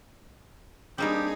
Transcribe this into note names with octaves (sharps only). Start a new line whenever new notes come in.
G3 A#3 C4 D4 D#4 G4 G#4